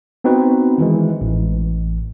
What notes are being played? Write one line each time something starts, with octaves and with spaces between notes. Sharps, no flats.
B3 C4 D#4 F#4 B4
D#3 E3 G#3
A1